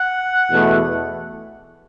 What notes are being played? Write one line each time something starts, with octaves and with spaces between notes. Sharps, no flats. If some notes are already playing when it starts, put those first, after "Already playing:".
Already playing: F#5
E2 B2 A3